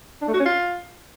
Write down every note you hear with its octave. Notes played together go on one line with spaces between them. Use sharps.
D4
A3
F#4
C#4
F4